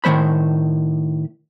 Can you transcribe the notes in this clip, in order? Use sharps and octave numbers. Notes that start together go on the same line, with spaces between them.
A2 D#3 G#3 C5 B5